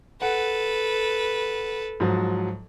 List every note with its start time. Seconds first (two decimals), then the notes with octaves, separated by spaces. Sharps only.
0.22 A4 B4 F#5
2.00 G#2 F3 F#3